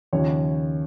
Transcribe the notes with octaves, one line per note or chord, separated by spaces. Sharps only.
D#2 C#3 F3 C#5